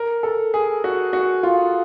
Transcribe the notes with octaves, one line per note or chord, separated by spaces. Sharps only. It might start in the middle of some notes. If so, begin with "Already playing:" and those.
Already playing: A#4
A4
G#4
F#4
F#4
F4